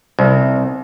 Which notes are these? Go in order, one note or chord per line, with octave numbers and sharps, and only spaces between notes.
C2